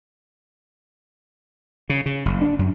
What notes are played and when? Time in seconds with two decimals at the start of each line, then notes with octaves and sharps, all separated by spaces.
1.90 C#3
2.06 C#3
2.25 F#1
2.41 D4
2.59 F#2